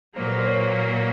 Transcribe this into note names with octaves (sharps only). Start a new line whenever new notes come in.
A#2 F#3 A#3 C5
B4
C5
C#5